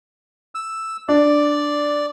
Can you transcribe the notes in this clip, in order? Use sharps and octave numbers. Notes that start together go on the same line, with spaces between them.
E6
D4 D5